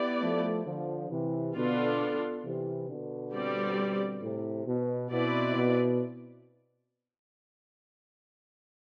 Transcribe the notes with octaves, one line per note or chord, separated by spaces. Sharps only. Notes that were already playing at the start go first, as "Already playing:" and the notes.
Already playing: B3 E4 G4 D5
F3 A3
D3 F3
C3 E3
B2 D3 B3 D4 F4 A4
C3 E3
B2 D3
G3 C4 G4 D5
A2 C3
B2
B2 C4 E4 B4 D5
B2